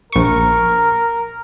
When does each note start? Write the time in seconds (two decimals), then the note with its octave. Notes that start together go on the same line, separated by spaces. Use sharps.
0.12 A#1 A#4 C#6